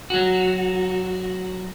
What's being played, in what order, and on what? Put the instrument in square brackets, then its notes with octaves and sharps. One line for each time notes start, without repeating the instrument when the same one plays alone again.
[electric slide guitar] F#3 F#4